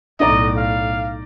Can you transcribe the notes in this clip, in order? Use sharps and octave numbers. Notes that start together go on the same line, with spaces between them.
B1 A2 D#4 D5 D#5 A#5
F5